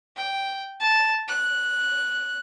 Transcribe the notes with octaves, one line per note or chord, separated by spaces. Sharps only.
G5
A5
F#6